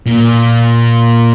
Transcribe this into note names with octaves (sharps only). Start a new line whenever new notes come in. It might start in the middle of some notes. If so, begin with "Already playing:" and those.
A#2